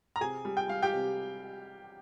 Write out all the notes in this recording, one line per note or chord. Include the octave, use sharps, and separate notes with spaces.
A#5
C3 G#4 G#5
G3
G5
G3 F5
G4 G5
C3